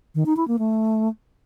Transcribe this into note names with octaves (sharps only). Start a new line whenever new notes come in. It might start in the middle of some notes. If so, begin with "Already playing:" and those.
D#3
D#4
E4
A#3
A3